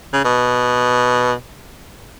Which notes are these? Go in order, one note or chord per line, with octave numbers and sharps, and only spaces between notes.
C#3
B2